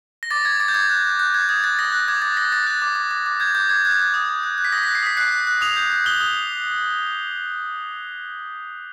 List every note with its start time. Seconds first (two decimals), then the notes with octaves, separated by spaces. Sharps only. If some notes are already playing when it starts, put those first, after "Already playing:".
0.23 A#6
0.31 D6 A6
0.45 D6 G#6
0.60 D6 A6
0.68 G6
0.74 D6 G#6
0.90 F#6
1.05 F#6
1.19 F#6 G6
1.34 F#6 G#6
1.49 D#6 G#6
1.64 F#6 A6
1.79 D#6 A#6
1.92 F#6
2.08 D6 G#6
2.22 D6 A6
2.37 D6 A#6
2.52 D6 A6
2.67 F#6
2.82 D6
2.95 D6
3.11 D6
3.26 D6
3.40 G6 G#6
3.55 D6 G6
3.69 D6 G#6
3.85 F#6 G#6
3.99 F#6
4.14 D#6
4.29 D#6
4.43 F#6
4.58 F#6
4.65 B6
4.72 D#6 A#6
4.83 F#6 B6
4.95 C7
5.03 D#6 B6
5.17 F#6 C7
5.32 F#6
5.47 F#6
5.61 D#6 F7
5.76 G6
5.91 G6
6.06 D#6 G7
6.20 D#6